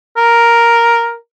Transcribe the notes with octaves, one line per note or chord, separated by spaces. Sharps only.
A#4